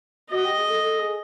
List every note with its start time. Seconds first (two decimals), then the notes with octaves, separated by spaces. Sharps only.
0.30 F#4 D#5
0.44 G4
0.56 G#4
0.69 A4
0.83 A4
0.99 G#4